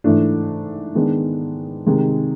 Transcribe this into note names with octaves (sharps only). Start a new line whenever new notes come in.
G#2 E3 A3 D4
D#3 G#3 B3 D4
C3 D#3 G#3